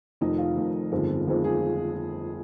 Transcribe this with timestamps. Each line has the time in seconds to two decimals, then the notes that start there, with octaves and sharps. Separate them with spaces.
0.21 F1 F2 D#3 D#4
0.38 F4
0.57 F1 F2 D#3
0.92 G1 F2 D#3 G#3 C4
1.27 G1 F2 D#3 G#3 C4
1.44 G#4